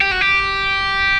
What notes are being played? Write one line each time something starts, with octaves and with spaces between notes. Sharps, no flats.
G4
F#4
G4